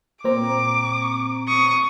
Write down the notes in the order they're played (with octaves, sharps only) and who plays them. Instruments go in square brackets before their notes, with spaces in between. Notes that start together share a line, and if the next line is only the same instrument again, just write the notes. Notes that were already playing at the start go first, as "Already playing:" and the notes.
[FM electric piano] A#2 C4 A#5 [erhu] D6
[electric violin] C#6 [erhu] D#6